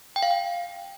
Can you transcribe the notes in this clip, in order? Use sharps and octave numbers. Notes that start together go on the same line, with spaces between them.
G5
F5
G5